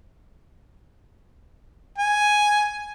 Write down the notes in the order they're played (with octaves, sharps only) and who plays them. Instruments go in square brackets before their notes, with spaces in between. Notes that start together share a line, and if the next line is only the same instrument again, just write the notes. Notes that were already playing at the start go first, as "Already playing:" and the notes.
[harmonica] G#5